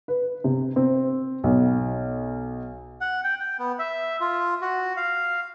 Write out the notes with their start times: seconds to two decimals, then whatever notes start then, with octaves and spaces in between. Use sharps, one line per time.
0.08 B4
0.44 C3
0.76 C4
1.44 B1
3.01 F#5
3.24 G5
3.40 G5
3.59 B3
3.79 E5
4.21 F4
4.61 F#4
4.97 F5